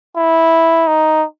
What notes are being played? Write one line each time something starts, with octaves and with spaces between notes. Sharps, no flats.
E4
D#4